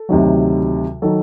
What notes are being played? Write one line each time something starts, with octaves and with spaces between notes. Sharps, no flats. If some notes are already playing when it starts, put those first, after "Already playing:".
Already playing: A4
D2 C3 D#3 F#3
D#3 F#3 A4